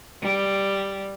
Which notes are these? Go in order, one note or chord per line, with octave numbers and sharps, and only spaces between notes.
G3